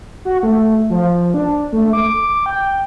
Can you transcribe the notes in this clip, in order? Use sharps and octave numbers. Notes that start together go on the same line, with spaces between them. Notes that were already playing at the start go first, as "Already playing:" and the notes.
F#4
A3
F3
D4
A3
D6
G5